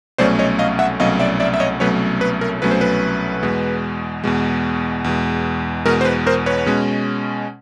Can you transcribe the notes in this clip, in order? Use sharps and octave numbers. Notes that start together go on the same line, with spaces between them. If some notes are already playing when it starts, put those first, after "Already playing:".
C2 B2 F#3 A3 C#4 C5 D5
C#5 D#5
D#5 F5
E5 F#5
C2 B2 F#3 A3 C#4 D#5 F5
D5 E5
D5 E5
E5
C#5 D#5
C2 B2 F#3 A3 C#4 B4 C#5
B4
A#4
C2 B2 F#3 A3 C#4 B4
C5
B4
E2 B2 G#3
E2 B2 G#3
E2 B2 G#3
E2 B2 G#3 A#4
C5
B4
A#4 C5
B4 C#5
B2 G#3 C#4